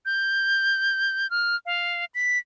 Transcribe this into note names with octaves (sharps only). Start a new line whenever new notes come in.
G6
F6
F5
B6